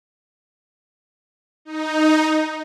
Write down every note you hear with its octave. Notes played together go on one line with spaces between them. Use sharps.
D#4